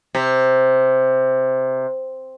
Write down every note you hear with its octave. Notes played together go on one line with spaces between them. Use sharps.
C3